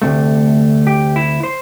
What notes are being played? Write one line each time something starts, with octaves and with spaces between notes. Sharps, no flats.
D2 C3 A3
G4
E4
C5